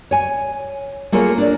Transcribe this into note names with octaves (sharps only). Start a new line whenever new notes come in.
C#5 G#5
A3 A#3 F4 G#4 A#4 C#5
D4 A#4 D5